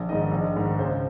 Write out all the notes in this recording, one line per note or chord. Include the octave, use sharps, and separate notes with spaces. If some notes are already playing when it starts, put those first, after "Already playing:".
Already playing: A#1
G#2 D#3 D#5
A#1
G#2 D#3
C#2 C5